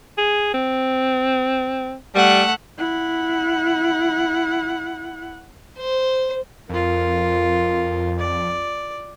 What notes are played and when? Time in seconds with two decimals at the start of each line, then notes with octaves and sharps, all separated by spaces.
0.18 G#4
0.54 C4
2.15 G3 A3 F#5
2.78 E4 F#5
5.78 C5
6.69 F2 F4 A#4
8.19 D5